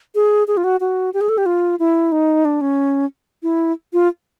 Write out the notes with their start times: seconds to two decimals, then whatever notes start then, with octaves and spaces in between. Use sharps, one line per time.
0.15 G#4
0.48 G#4
0.57 F4
0.64 F#4
0.80 F#4
1.14 G4
1.21 G#4
1.29 A4
1.38 G4
1.46 F4
1.79 E4
2.12 D#4
2.45 D4
2.61 C#4
3.43 E4
3.93 F4